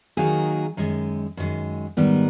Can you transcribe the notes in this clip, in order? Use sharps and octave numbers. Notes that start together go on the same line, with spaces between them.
D#3 F#3 A#3 D#4 G#4
F#2 D#3 G#3
F#2 D#3 G#3
G#2 D#3 G3 B3